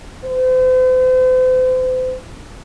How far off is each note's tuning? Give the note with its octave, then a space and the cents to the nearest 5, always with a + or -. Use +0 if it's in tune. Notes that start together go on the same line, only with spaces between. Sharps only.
C5 -40